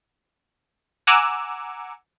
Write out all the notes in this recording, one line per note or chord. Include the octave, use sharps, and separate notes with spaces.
F#5 G#5 A#5 D6 E6